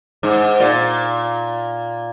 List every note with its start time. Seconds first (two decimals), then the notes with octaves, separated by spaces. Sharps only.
0.23 G#2
0.60 A#2